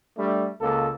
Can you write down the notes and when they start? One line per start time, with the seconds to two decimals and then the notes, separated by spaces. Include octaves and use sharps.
0.17 G3 A3 D4
0.60 C#2 A#3 A4